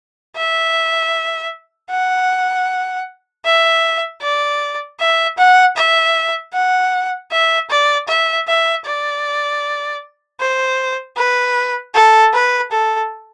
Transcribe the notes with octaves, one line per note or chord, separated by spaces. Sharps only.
E5
F#5
E5
D5
E5
F#5
E5
F#5
E5
D5
E5
E5
D5
C5
B4
A4
B4
A4